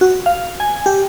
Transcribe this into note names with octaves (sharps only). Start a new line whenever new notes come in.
F#4
F5
G#5
G4